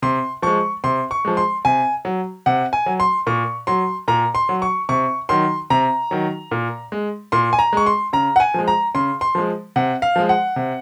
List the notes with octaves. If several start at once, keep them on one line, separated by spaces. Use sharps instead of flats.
C3 C6
F3 G#3 C#6
C3 C6
C#6
F3 G#3
C6
C3 G#5
F#3
C3 F#5
G#5
F#3
C6
A#2 C#6
F#3 C6
A#2 A#5
C6
F#3
C#6
C3 C#6
D#3 F#3 C6
C3 A#5
D#3 F#3
A#2
G#3
A#2 C6
G#5
A#5
G#3 C#6
C6
C#3 A#5
F#5
G#5
F3 G#3
A#5
C#3 C6
C6
F3 G#3
C3 F#5
F5
F3 G#3
F#5
C3